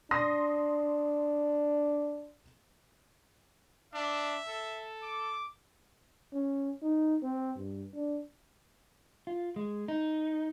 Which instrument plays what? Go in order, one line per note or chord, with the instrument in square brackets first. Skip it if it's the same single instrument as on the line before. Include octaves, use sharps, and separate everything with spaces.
[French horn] D4 [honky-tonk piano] C6 D#6 A#6
[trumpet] D4 [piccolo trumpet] E5
[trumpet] A4
[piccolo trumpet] D6
[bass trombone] C#4
D#4
C4
G2
D4
[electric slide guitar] F4
G#3
D#4